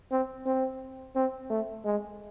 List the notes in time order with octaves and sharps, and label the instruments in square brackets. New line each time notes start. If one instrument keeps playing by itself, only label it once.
[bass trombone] C4
C4
C4
A3
G#3